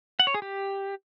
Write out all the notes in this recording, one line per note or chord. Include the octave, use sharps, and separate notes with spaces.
F#5
C#5
G#4
G4